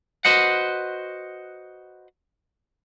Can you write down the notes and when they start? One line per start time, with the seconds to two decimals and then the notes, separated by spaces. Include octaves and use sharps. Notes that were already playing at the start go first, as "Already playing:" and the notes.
0.25 F#4 B4 C5 D#5 F#5